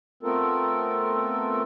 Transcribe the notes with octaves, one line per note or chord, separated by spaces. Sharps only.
A3 B3 C4 F4 A4 A#4